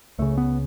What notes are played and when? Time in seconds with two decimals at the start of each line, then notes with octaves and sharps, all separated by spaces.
0.19 C#2 C#3 A3
0.38 B3